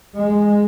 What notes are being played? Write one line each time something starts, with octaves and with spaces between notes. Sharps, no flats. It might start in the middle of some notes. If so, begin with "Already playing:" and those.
G#3